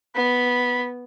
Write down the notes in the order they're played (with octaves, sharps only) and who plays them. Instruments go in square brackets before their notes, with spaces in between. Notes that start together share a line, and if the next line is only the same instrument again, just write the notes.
[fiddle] B3 [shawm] B5